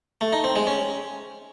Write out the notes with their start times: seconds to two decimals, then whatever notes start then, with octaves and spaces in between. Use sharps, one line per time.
0.21 A3
0.33 D#4
0.44 C4
0.55 G#3
0.67 C#4